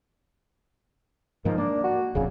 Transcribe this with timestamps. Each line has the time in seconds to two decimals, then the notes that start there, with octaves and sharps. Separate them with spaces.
1.45 G#2 D#3 F3 A#3
1.58 A#3 D4
1.84 F#4
2.15 D1 A#1 F2 C#3